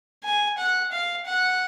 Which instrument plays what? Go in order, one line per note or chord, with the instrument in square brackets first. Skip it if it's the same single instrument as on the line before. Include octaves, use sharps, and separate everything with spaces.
[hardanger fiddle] G#5
F#5
F5
F#5